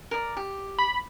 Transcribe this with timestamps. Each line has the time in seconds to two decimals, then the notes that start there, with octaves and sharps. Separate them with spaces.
0.11 A#4 D5
0.37 G4
0.79 B5